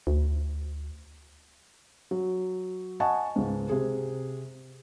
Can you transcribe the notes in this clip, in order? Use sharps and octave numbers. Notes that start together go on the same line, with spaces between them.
D2
F#3
D#5 F#5 G#5 A5 C#6
C#2 G#2
C3 G#4